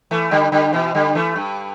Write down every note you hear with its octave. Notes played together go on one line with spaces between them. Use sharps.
E3 A3
D3 G3
D3 G3
B2 E3
D3 G3
E3 A3
G2